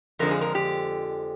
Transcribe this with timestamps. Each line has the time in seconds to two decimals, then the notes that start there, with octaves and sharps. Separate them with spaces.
0.19 F2 D3 F3 G#3 A#4
0.31 G#4
0.41 A#4
0.55 G4